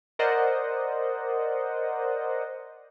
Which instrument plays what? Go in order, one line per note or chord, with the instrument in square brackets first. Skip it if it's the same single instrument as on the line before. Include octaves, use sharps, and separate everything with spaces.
[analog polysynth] A#4 C5 D5 D#5 F#5